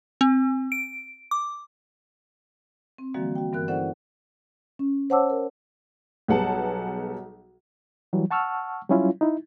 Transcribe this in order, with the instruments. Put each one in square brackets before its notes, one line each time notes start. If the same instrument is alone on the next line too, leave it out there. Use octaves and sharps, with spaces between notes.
[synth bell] C4
D7
D6
[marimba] C4
D3 E3 F3 G3 A#3 F#4
F#4 G5
G2 E3 B3 A#4 F#6
C#4 E4 A4 C5 D5 F#5
C#4
C5 C#5 F#5 A5 D6 E6
A#4
[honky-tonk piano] B1 G3 B3 G#4 F#5 A5
[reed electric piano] E3 F#3 G3
F#5 A5 C#6 E6 F6
F#3 G3 C#4 E4 F4
D#4 E4